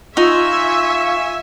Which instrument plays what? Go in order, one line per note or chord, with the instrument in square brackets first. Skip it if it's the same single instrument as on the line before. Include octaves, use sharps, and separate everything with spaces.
[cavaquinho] D#4 [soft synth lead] F4 [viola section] E5 G#5 [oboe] C#6